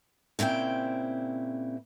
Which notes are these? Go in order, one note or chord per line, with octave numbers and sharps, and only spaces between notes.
A#2 C#3 C4 E4 G5